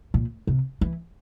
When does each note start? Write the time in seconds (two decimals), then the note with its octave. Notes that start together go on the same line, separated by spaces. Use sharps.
0.14 A#2
0.47 C3
0.81 E3